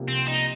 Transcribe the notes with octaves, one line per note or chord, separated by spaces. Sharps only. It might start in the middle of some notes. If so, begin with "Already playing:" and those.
Already playing: C2 C3 F3 A#3
C4
D#4